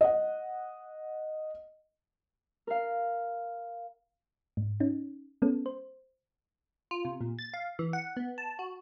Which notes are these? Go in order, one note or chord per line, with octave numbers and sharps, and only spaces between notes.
D#5 F#5
A#4 F5
G#2
C#4 D#4
G#3 B3 C#4 A4
C5
F4
C3
A#2
A6
F5
E3
F#5
B3
A5
F#4